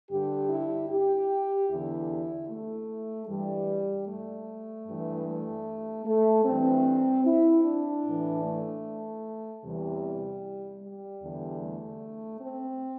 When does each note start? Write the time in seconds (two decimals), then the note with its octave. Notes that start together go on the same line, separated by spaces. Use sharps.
0.10 G2 D3 G4
0.50 E4
0.90 G4
1.69 E2 D3 E4
2.49 A3
3.28 G2 E3 G3
4.08 A3
4.87 G2 E3
5.26 A3
6.05 A3
6.45 G2 E3 C4
7.25 E4
7.64 D4
8.05 A2 E3
8.45 A3
9.63 E2 C3 E3 G3
10.83 G3
11.22 E2 D3
11.62 A3
12.41 C4